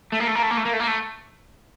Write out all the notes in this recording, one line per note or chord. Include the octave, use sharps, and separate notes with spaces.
A3
A#3
A3
A#3
A3
A#3
A3
A#3
A3
A#3
A3